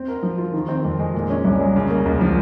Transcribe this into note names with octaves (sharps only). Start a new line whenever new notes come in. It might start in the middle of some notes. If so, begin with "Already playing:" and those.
Already playing: C4
A#4
F3
F4
D#3
C4
F2
G#3
A#2
C#4
C2
G#3
C#3
A#3
C#2
F3